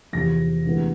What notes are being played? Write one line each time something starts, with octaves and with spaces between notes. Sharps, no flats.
E2 C3 F3 A#6
D2 C3 E3 G#3 B3